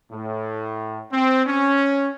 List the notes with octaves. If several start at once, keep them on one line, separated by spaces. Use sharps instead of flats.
A2
C4
C#4